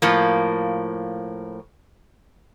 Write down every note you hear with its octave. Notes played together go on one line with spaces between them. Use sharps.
A2 F3 A#3